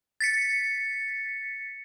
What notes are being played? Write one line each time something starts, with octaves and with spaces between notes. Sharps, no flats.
A6 B6 C#7